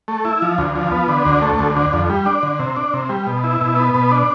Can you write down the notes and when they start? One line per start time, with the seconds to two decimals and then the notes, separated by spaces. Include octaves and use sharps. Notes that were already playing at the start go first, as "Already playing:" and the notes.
0.08 A3
0.25 E4
0.42 F3
0.58 D2
0.75 F3
0.92 B3
1.08 D3
1.25 D2
1.42 A3
1.59 D2
1.76 D3
1.93 F2
2.10 G3
2.26 D4
2.43 D3
2.59 C3
2.76 D4
2.93 C3
3.09 G3
3.27 B2
3.44 E4
3.61 B2
3.76 B3
3.94 B2
4.11 D4